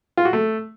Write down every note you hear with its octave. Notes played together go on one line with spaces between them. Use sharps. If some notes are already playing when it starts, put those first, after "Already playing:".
F4
F#4
A3